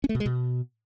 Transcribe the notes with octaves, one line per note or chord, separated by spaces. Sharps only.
C#4
A3
B2
G#3
B2